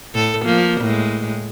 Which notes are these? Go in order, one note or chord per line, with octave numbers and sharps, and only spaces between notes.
A2 A4
F3 A#3
A2 G#3